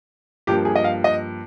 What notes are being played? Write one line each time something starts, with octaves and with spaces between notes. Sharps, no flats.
G2 F3 A#3 G4
G#4
D#5
F5
D#5